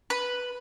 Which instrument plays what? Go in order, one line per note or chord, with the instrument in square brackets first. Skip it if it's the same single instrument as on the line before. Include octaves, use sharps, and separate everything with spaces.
[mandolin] B4